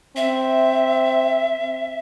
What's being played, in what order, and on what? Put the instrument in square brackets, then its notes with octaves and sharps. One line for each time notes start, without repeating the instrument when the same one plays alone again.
[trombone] C4 [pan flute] E5